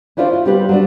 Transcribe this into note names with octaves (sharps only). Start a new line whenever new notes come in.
C#4 D4 E4 F4 C5
F4
G3 C4 G4 B4
F#3 G3 D4